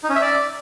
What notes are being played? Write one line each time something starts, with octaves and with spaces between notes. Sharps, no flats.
D#4
C#4
E5
D5